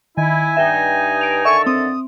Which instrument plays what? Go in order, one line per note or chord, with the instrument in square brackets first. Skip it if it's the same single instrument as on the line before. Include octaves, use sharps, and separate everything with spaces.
[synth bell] D#3 [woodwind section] E4 [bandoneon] G#5
[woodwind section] G2 D#4 [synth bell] E5 G5
[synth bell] D7 F7
[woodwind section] D3 D#3 A4 [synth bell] E5 [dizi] C#6
[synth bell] C4 [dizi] D#6